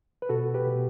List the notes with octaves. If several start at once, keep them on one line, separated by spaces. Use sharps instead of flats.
B4
B2 F#4 A4
G4 B4
B2